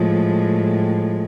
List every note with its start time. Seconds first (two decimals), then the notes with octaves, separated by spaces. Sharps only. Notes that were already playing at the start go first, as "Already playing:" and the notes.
Already playing: A2 F3 G#3